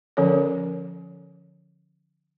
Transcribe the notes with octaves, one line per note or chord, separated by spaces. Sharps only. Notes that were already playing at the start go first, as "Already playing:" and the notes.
D3 F3 C#4 A4 C#5